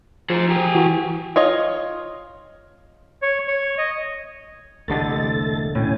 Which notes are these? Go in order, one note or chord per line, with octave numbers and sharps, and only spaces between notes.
F3 G#4 C5
G4 G#4
E3 F#4
F4 C#5 D#5
C#5
C#5
D#5
E1 C2 D3 A3 G4 A4 D#5 A6
A2 C#4 G#5